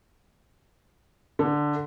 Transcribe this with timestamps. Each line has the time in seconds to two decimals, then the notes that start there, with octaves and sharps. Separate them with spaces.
1.39 D3